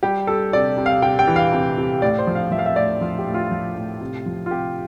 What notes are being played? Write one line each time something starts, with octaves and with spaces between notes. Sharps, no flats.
G3 G4
G3 A4
C3 D5
C3
F5
C3 G5
G5
E3
F5
C3
C3
A2 D5
C5
F3
F5
F3 E5
F5
E5
A2 D5
F3 F4
G4
A2
F4
F3
A2
C3
F3
F4
C3 G4